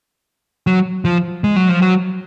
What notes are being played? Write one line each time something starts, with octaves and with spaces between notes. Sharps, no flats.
F#3
F3
G#3
F#3
F3
F#3